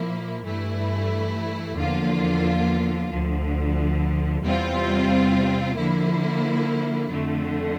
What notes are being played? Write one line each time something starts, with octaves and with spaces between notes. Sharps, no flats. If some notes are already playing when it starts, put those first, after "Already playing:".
Already playing: A#2 F3 A#3 E4
G2 E3 A3 E4
E2 D3 F3 A#3 F4
D2 D3 F3
E2 C3 G3 C4 F4
D3 F3 A#3 E4
F2 D3 A3